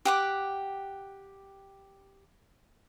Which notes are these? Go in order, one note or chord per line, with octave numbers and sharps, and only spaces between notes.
G4 F#5 D6